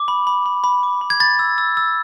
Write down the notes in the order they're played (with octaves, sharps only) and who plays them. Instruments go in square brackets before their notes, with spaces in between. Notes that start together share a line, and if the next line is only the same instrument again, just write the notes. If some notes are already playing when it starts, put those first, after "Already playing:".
Already playing: [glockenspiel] D6
B5
B5
B5
B5
D6
B5
G#6
B5 A6
E6
E6
E6